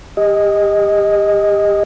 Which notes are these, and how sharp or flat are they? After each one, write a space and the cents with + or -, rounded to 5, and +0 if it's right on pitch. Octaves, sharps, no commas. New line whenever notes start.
G4 +30 D#5 +0